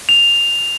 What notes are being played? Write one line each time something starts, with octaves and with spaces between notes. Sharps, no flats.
F7